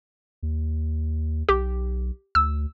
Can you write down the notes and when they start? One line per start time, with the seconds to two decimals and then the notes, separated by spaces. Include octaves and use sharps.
0.43 D#2
1.49 B1 G4
2.35 D2 E6